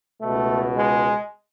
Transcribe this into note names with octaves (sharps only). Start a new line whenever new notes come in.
C#2 B2 A3
G#3